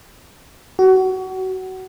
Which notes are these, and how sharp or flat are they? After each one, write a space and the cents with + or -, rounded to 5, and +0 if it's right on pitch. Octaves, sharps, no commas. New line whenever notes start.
F#4 +25